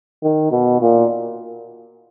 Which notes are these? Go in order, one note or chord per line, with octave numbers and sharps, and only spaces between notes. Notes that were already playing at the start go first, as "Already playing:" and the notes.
D#3
B2
A#2